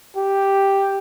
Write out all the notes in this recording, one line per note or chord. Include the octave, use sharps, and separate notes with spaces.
G4